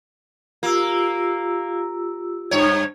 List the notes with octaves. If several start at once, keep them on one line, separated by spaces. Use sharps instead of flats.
A#3 F4 G4 E6
G2 C#5